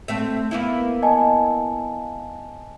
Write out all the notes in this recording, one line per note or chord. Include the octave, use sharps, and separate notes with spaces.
A3 C4 E5
A#3 B3 E4
D#5 G#5 A5